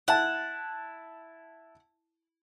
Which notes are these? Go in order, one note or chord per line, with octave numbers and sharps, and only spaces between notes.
E4 F#5 A5